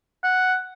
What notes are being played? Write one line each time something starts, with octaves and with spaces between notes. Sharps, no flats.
F#5